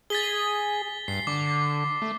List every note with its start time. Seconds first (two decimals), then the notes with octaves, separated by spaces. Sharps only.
0.10 G#4 A6 B6 G7
1.08 G2 C7
1.27 D3 D6
2.02 A3